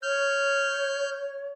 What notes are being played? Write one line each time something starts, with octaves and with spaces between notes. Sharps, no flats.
C#5 F6 G6